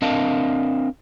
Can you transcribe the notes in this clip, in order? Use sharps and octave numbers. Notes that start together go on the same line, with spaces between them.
C4 D4 A#4 D#5 F5 A5